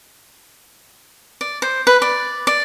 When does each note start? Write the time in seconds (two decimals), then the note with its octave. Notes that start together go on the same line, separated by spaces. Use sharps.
1.41 D5
1.62 C5
1.87 B4
2.02 D5
2.47 D5